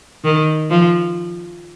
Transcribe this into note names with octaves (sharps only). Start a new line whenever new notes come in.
D#3
F3